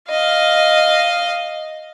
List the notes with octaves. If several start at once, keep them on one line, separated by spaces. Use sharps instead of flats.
D#5 F5